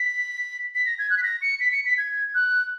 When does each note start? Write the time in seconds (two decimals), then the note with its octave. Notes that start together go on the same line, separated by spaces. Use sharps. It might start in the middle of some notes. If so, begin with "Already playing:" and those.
Already playing: B6
0.75 B6
0.86 A#6
0.99 G#6
1.10 F#6
1.18 B6
1.23 A#6
1.42 C#7
1.60 B6
1.72 C#7
1.85 B6
1.98 G#6
2.35 F#6